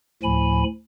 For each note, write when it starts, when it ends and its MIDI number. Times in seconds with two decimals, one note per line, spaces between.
0.23 0.64 38
0.23 0.64 45
0.23 0.64 53
0.23 0.64 80
0.23 0.64 83